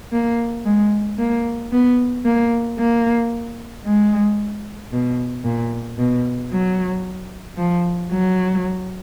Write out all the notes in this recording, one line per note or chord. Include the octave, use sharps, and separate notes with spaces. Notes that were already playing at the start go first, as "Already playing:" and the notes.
A#3
G#3
A#3
B3
A#3
A#3
G#3
B2
A#2
B2
F#3
F3
F#3